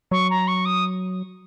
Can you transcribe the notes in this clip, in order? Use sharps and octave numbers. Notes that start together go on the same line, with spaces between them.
F#3 C#6
A#5
C#6
D#6